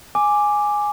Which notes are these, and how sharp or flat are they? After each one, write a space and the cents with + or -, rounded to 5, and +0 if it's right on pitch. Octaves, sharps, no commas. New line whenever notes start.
G#5 +0 D6 +0